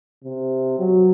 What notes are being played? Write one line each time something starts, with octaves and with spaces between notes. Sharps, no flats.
C3
F#3